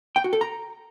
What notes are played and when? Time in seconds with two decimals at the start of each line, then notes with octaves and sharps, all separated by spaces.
0.16 G5
0.24 F#4
0.33 A4
0.41 A#5